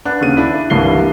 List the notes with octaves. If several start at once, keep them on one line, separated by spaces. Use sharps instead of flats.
D4 B4 F#5 F#6
D#2 C#3 D#7
D4 E4
C2 G2 E3 C7 G7